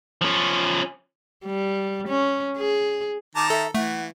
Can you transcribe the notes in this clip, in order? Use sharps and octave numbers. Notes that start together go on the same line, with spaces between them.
F3 C#4
G3
C#4
G#4
D#3 A5 A#5 D6
A4 E5
E3 A3 F#5